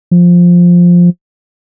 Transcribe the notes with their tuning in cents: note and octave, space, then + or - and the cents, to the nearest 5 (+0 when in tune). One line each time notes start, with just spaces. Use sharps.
F3 +5